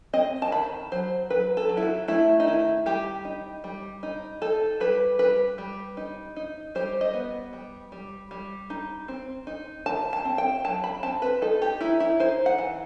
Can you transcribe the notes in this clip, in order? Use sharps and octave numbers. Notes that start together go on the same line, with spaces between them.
C4 D#5
A5
D#3 B5
F#3 C5
F#3 B4
A4
F#3
E4
F#4
A3 E4
D#4
D#3 E4
G3 G4
D#4
G3
D#4
D#4 A4
G3 B4
G3 B4
G3
D#4
D#4
G3 C5
D#5
B3
G3
G3
G3
D#4
C4
D#4
D#3 A5
A5
C4
G5
F#3 A5
B5
C4 A5
B4
D#4 A4
G4
D#4 E4
E4
D#4 C5
F#5
E3